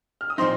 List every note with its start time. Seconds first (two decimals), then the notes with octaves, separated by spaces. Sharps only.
0.21 F6
0.30 D#6
0.38 A#2 F3 C4 D#4 C6